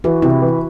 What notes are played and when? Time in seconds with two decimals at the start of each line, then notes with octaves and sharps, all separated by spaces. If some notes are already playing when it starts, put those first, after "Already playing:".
0.04 E3 F#4
0.22 C3 E4
0.42 E3